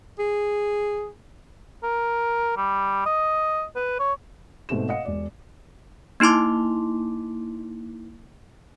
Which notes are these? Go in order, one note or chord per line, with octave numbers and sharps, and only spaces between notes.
G#4
A#4
G3
D#5
B4
C#5
G#2 B2 A3 C4 E7
D#5 F5 F#5 C#7
E1 D5
A#3 D#4 E4 C6 D6